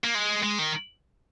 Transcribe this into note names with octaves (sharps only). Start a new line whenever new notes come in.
A#3
G#3
G#3
D#3